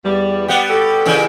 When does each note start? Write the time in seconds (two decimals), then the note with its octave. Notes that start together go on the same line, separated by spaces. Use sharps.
0.04 E2 G3
0.48 G3 B3 G4 F#5
0.70 F#4 G4 A4
1.05 A#2 C#3 E3